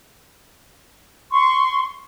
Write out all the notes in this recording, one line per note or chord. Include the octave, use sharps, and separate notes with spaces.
C6 C#6